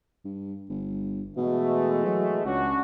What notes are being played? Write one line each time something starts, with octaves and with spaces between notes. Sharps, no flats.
G2
G1
B2 E3 G#3 A3
F#3
C#2 C#4 D4 F#4